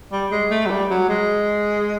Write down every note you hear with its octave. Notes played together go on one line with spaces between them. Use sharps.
G3
G#3
A3
F#3
G3
F#3
G#3